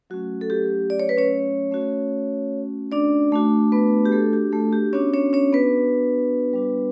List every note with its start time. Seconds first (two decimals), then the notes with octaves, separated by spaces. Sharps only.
0.10 F#3 A3 C#4 F#4
0.41 A4
0.50 G4
0.90 D5
1.00 C#5
1.09 B4
1.17 C#4 C#5
1.71 A3 C#4 F#4
2.92 D4 D5
3.32 A3 D4 F#4
3.72 B3 B4
4.06 G4
4.12 A3 A4
4.33 G4
4.52 A3 A4
4.73 G4
4.93 B3 C#4 D4 F#4 C#5
5.14 C#4 C#5
5.33 C#4 C#5
5.53 B3 B4
6.53 G3 D4 F#4